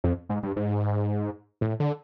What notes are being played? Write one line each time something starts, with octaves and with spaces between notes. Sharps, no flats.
F2
G#2
G2
G#2
A2
D3